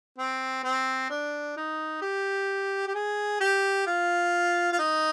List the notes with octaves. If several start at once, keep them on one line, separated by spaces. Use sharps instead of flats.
C4
C4
D4
D#4
G4
G4
G#4
G4
F4
F4
D#4